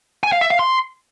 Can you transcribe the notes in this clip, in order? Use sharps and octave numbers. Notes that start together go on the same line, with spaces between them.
G#5
F5
E5
F5
C6